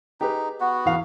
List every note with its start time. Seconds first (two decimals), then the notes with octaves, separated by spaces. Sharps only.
0.21 D#4 G4 G#4 B4
0.61 B3 F#4
0.85 E2 F5